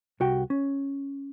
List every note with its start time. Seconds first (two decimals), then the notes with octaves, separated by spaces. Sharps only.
0.20 C2 F#4 G5
0.50 C#4